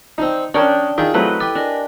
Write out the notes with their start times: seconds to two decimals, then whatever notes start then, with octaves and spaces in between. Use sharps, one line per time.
0.18 C4 D4 D#4
0.54 C#4 D4 A#4 C#5 D5 G5 D#6
0.98 D#3 E4 F4 G#4
1.14 F#3 A3 C4 B4 D#5
1.40 E4 G4 A4 D6
1.55 D4 A#4 D#5 G#5